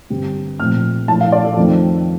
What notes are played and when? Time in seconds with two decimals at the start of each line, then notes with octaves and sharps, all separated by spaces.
0.10 G2 D3 G3 C4
0.60 A#1 A#2 A3 C4 F6
1.08 A#1 A2 A3 A5
1.21 F5
1.32 D5
1.44 A4
1.57 F2 D#3 A3 C4